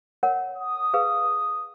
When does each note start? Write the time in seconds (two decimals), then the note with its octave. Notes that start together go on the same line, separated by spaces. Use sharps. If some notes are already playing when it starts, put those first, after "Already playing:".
0.23 A#4 C#5 F#5
0.58 D#6
0.94 G#4 B4 F5